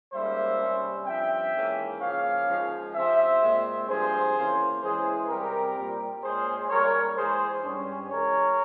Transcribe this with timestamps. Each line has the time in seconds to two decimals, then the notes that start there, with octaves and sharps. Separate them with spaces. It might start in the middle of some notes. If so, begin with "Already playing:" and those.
0.13 G#2 G3 A#3 C#4 C5 E5
0.60 C3 G3 C#4
1.06 G2 F3 C4 E5 G5
1.54 G#2 E3 A#3 C#4
2.00 C#3 F3 A#3 C#4 C#5 F5
2.47 G#2 F3 G#3 C#4
2.94 C3 F3 C4 C5 E5
3.42 A#2 G#3 C4
3.88 G2 F3 C4 G#4 C5
4.35 C#3 E3 A#3 C#4
4.82 E3 G#3 C#4 G#4 C5
5.28 C3 G3 C4 G4 A#4
5.76 A#2 G3 C4
6.22 A#2 G#3 C#4 G#4 C5
6.70 G#2 G3 A#3 A#4 C#5
7.16 G#2 E3 G#3 G#4 C5
7.63 G2 G3 C#4
8.10 C#3 E3 G#3 A#4 C#5